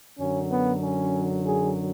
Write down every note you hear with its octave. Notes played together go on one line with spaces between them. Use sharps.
F#2 D3 F#3 C#4
B3
C#4
G#4